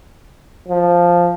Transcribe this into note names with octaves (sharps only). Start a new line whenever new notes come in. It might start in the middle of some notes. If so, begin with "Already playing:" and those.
F3